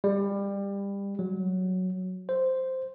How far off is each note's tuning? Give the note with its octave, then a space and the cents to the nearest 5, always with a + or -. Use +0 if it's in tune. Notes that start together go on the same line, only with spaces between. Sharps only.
G3 +25
F#3 +0
C5 -5